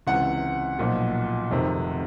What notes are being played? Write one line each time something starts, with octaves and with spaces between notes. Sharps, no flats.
C#2 C3 E3 F#5
B1 A#2 F3
F1 F2 C3 D#3